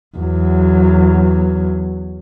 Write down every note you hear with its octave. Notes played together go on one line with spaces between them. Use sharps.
E2 F#3